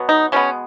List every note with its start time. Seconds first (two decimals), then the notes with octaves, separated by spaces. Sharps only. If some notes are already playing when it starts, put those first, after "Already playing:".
Already playing: B2 F#3 B3
0.09 D#4
0.32 B2 G#3 B3 C#4